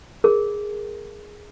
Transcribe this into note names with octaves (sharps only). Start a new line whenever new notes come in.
G#4 A#4